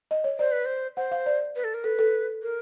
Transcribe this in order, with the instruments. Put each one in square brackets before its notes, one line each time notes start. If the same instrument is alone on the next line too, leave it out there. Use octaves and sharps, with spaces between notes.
[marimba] D#5
C#5
[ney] C5 [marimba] D5
[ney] B4
C5
[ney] C5 [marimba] F#5
[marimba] F5
D5
[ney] B4
A4
A#4
[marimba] A4 [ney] B4
[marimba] A4
[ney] A#4